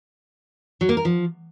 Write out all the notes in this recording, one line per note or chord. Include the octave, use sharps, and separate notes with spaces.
F#3
A#3
A#4
F3